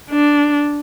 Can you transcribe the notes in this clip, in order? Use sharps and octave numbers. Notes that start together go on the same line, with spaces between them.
D4